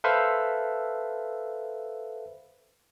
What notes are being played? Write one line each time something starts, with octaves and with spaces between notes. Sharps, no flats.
A4 B4 C5 E5 F5